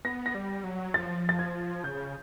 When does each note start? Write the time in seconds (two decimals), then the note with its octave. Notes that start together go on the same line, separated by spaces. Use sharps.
0.05 B3 A#6
0.26 A#6
0.35 G3
0.64 F#3
0.94 F3 A6
1.29 A6
1.39 G#6
1.84 C#3 G6